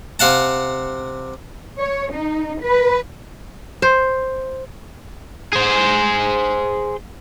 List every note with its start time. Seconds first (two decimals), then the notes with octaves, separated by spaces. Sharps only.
0.19 C3 F5 F#5 A5
1.80 C#5
2.13 D#4
2.62 B4
3.82 C5
5.53 G#4 C5